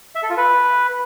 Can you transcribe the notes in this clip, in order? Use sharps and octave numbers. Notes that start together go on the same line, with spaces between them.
E5
A4
F4
B4